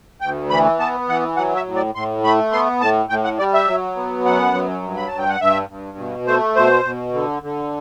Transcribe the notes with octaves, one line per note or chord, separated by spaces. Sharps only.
D2 G5
E3 B5
B3 A5
E3 F#5
F#3 F#5
E5
A2
D5
A2 C6
A3 B5
B3 C6
A2 A5
A2 G5
F#5
G3 D5
E5
F#3
B3
F#2 F#5
F#3
G2
B5
G2 A5
G5
F#5
G2 E5
G2
B2
A3 C5
B2 C5
B2
D3
D3